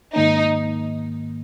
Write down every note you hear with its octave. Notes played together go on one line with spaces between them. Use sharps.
G#2 D#3 A#3 D#4